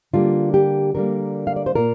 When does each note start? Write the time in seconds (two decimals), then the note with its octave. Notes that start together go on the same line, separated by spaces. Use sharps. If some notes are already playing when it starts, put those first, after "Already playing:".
0.13 D3 G3 A#3 F4
0.54 G4
0.95 D3 G3 A#3 A#4
1.47 F5
1.56 D5
1.66 C5
1.75 A#2 A#3 F4 A#4